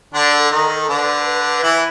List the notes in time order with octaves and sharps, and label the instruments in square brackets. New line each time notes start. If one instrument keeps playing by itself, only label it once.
[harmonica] D3 D4 [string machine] A4
[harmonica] D#3 D#4
[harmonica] D3 D4 [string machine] B4
[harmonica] E3 E4